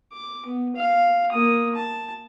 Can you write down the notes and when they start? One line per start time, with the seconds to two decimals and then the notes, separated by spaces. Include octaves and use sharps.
0.13 D6
0.46 B3
0.76 F5
1.32 A#3 D#6
1.75 A5